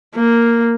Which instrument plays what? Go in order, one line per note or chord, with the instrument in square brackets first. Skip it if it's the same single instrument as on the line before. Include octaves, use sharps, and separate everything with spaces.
[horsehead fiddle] A#3